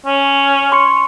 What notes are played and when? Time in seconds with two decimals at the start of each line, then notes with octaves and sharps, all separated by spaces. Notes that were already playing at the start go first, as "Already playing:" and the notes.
0.06 C#4
0.72 C6 C#6 C#7